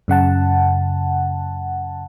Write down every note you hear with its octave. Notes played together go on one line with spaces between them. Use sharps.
F#2 C#3 F#5 A5